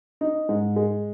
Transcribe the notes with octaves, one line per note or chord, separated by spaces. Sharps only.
D#4
G#2
G#3